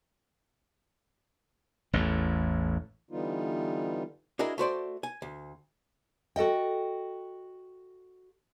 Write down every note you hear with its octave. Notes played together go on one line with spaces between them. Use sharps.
A1 E2 A2
D3 E3 G3 B3 D#4 F4
D4 E4 F#4 G#4 A#4 D#5
A3 F#4 C5 D5
G#5
D2
F#4 A4 D#5 G5